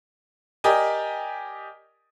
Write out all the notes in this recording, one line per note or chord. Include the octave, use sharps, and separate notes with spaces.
G4 A#4 D5 D#5 G#5